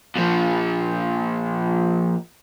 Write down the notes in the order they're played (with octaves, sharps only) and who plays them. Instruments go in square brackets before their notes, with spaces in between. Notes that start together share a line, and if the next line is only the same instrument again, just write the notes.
[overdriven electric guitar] A#2 F3